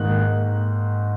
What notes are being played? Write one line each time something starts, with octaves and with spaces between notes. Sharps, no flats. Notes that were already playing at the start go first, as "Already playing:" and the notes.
Already playing: G#2 D#3 A#3 D#4 F#6